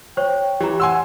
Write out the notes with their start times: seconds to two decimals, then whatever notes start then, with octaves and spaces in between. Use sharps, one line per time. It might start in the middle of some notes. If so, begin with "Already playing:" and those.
0.17 C5 C#5 G5 C#6
0.60 E3 G4 A#5
0.80 F#5 G#5 C6 E6